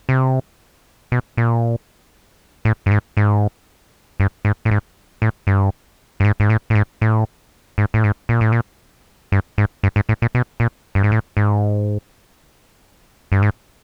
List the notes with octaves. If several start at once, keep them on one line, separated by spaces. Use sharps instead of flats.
C3
B2
A#2
A2
G2
G#2
G#2
G2
G#2
A2
G#2
A2
G2
G2
G#2
G#2
A2
A2
G#2
A2
G#2
A2
G#2
A#2
A2
A#2
G2
G#2
G2
G#2
A2
A#2
B2
A#2
G2
G#2
A2
G#2
G2
G#2